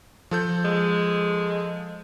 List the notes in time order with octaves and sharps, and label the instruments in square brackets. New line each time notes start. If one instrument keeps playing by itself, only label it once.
[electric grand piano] F3 A4 G6
[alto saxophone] G#3